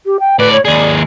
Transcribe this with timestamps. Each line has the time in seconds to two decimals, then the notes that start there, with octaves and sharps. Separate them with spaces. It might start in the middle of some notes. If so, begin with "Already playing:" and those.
0.06 G4
0.20 G5
0.39 A2 B4 D5
0.52 C#5
0.65 D#2 G#4 D5